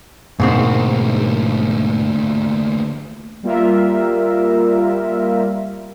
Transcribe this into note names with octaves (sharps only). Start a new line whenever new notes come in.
D2 G#2 B2 A#3 C4
G3 A#3 F4 A#4 E5